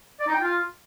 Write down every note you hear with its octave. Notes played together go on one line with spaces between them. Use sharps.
D5
D#4
G5
F4